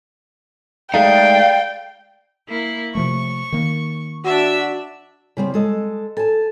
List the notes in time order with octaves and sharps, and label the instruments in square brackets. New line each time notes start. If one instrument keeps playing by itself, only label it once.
[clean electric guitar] G#3 A3 D#4 [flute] D5 [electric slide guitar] F5 [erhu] G5
[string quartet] A#3 E4
[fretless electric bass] C3 F3 A3 [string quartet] C#6
[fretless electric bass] D#3 A#3
[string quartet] D4 E5 E6 [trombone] F#4
[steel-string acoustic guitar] C#3 G3 C4
G#3 A4 D#5
[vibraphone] A4 [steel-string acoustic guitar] G#5 A5